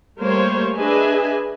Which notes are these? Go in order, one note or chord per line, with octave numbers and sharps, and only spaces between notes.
G3 A3 A#3 C5 C#5
D4 G#4 B4 D#5 E5 G#5